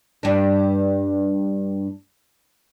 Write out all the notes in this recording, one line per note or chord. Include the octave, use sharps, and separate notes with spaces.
G2 D4